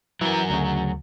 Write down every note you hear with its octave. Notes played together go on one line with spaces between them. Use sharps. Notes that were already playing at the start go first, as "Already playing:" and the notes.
E3 F#3 A#4
D2 C#3